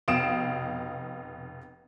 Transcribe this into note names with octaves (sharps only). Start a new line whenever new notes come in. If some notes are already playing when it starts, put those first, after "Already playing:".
F1 B2 F5 D#6 D7 E7